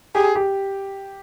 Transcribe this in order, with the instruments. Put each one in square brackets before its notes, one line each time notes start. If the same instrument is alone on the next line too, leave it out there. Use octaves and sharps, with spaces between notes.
[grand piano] G4 [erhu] G#4
[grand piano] G4